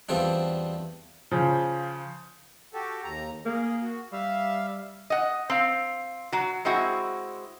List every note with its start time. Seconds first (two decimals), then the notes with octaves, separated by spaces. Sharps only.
0.09 E2 F3 G3 C4 D4
1.32 C#3 F3
2.74 F#4 G4 A4
3.04 D#2 A#5
3.45 A#3 G#4
3.82 F#4
4.12 G3 E5 F5
5.10 D#5 F#5
5.50 C4 F5
6.32 F#3 F#4
6.65 G#3 C4 E4 F#4